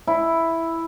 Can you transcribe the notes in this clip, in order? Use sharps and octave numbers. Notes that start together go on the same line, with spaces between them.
E4